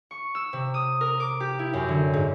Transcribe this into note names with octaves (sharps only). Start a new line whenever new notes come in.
C#6
E6
C3
D#6
A#4
D6
G4
E4
F#2
D3
G#2